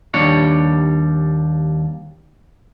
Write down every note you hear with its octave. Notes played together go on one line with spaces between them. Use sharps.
D#2 G3 D4 C#5